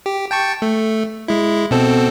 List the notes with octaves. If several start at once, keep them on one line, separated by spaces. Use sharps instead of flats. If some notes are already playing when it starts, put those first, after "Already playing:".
G4
G5 A5 C#6
A3
G#3 E4
B2 C4 A4